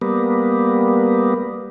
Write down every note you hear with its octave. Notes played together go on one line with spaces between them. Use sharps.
G3 A#3 B3